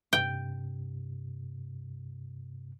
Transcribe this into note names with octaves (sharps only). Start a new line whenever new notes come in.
G2 C3 G5